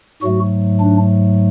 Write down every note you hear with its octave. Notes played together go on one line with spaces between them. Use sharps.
G#2 F#3 A3 F#4
D4